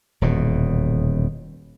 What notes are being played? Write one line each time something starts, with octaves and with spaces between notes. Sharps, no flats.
D#1 E2 B2